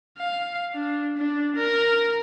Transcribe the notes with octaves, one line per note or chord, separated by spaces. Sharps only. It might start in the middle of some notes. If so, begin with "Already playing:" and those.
F5
D4
D4
A#4